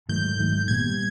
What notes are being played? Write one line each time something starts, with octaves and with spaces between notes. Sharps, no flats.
G#2 D#3 F#3 A3 G6
G#2 D#3 F#3 A3
A#2 G3 B3 G#6